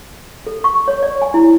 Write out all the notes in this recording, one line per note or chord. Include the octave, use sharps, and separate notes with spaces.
A4
C#6
C#5
D5
G#5
E4